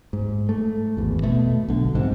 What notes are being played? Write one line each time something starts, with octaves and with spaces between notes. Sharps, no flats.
G#2
A3
G#1 E2
B2 A3
B1 D3
A#1 G#2 C3